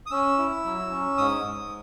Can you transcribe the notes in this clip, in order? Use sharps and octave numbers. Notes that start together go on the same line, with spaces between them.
D#6
C#4 E6
E4
F#3
C#4
G#2 D#6
G#2